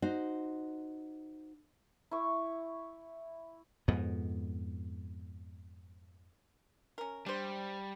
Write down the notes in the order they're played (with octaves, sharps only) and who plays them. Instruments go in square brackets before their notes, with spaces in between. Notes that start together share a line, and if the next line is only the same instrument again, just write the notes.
[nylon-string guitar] D#4 F#4 C5
[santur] E4 C#6
[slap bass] F2 G#2 B2 B3
[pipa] C#4 A#4
[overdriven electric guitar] G3 [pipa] D4 C5